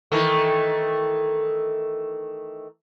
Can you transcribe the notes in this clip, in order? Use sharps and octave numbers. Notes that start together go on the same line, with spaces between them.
D#3 E3 A3